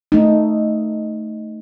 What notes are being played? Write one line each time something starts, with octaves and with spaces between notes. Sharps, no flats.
A3 D#4